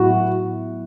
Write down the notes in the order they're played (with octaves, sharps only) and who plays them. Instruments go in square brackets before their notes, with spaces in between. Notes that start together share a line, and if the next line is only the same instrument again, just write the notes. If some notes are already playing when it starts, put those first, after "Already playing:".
Already playing: [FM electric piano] A2 F#3 B3 E4 [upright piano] F#4